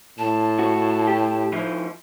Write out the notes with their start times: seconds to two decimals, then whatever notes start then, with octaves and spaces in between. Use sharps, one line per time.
0.19 A2 A5
0.59 F#4
1.07 G4
1.52 F3 D#4 E4